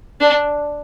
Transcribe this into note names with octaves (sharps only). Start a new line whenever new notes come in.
D4